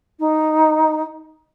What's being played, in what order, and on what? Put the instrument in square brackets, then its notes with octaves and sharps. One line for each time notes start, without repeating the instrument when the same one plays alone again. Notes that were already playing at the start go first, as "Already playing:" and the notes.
[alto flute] D#4